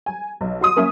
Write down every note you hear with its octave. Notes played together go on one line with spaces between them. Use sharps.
G#5
B1
F#4 C6 D#6
A#3 C#4 A#4 C#5 E5